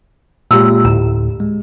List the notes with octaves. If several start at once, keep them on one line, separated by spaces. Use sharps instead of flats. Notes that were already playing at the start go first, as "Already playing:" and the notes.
A#2 G#3 G4 E6
D2 A2 A#5
G#3